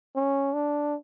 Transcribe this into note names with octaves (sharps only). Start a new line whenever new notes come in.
C#4
D4